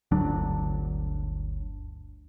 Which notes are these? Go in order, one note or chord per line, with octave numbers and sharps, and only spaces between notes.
G1 D2 F#3 D4